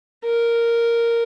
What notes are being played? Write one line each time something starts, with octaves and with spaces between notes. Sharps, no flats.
A#4